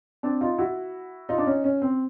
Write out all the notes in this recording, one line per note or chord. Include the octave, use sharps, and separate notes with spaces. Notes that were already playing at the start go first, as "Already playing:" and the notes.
C4 D4
D#4 F4
E4 F#4
D#4 F4
D4
C#4 D#4
C#4
C4